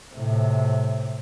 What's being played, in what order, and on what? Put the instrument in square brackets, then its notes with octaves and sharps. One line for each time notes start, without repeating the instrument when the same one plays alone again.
[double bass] A2 C3